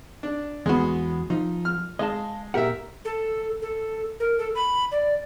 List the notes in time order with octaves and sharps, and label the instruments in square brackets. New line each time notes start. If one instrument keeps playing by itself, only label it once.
[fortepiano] D4
[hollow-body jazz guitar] E2 F#4 [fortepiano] G#3 B3
[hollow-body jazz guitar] F3 [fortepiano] D#4
[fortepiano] F6
[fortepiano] G#3 [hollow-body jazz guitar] D#5 F5 A5
[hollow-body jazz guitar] A#2 G4 F#5 [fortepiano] A#4 E5
[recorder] A4
A4
A#4
A4
B5
D5